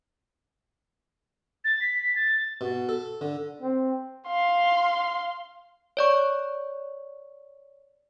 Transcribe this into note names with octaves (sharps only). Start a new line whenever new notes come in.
A6
B6
A6
B2
A4
D3
C4
F5 C6
C#5 D5 C#6